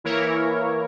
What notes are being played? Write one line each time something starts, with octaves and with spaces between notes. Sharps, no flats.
E3 A#3 E4 A#4 C#5